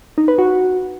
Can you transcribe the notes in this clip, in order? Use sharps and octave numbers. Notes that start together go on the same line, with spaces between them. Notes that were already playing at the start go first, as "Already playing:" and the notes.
D#4
B4
F#4